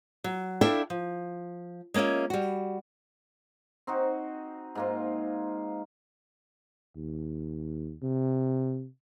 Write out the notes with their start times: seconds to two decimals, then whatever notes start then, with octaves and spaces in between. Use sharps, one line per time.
0.24 F#3
0.61 D4 E4 A4 E5 F5 G5
0.90 F3
1.94 G#3 A#3 C#4 F4 E5
2.30 G3 F#4
3.87 C4 D#4 F#4
4.75 G#2 A#3 F4
6.96 D#2
8.02 C3